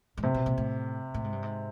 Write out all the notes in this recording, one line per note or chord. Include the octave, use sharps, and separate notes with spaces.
G#2
A2 C3
B2
A#2
A2
A2
G#2
G2
G#2